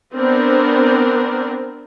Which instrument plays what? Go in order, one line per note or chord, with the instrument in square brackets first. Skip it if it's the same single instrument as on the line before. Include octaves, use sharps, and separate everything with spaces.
[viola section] B3 C4 D4 A#4